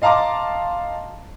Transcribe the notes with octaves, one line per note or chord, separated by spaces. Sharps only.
D#5 F5 A5 A#5 C6 D6